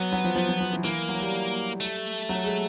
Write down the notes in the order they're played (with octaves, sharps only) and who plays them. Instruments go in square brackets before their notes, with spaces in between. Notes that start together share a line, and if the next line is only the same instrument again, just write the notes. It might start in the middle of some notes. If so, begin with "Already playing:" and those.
Already playing: [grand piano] F#3 [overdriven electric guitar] B3
[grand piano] F#3
F3
F3
F3
F3
E3
[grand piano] E3 [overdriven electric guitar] A#3
[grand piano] F#3
G3
[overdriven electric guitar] A3
[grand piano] F#3
G#3